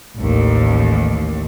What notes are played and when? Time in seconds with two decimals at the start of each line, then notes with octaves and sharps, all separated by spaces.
0.16 A1 D#2